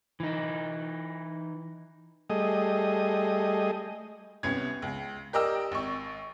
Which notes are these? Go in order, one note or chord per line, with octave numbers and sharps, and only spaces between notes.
E3 D#4
G3 A3 G#4 D#5
C2 B3 C#4 G#6
C#2
G4 A#4 D5 D#5 G5 E6
G#1 C#6